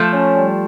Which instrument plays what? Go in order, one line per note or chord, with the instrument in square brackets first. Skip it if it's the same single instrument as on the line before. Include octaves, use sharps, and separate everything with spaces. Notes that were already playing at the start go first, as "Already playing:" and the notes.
Already playing: [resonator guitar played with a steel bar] F3 A3
[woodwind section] C#4
G3